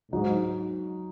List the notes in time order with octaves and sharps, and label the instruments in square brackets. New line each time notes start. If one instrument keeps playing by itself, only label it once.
[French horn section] G#2 [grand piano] F#3 D#4 F#4